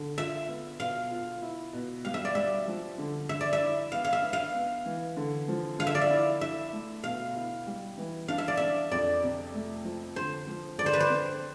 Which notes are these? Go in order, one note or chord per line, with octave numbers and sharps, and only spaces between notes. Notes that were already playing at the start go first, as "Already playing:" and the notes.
Already playing: D3
F4 E5
B3
B2 F5
F4
E4
B2
G3 F5
E5
D5
G3 E5
F3
D3
D3 E5
D5
E5
E4
B3 F5
F5
E5
B3
F5
B3
E3
D3
F3
D3 F5
E5
D5
E5
E4
E4 E5
A3
B2 F5
E4
G3
E3
D4 F5
E5
D5
D4 E5
F2 D5
C3
A3
F3
D3 C5
F3
D3 D5
C5
B4
C5
C4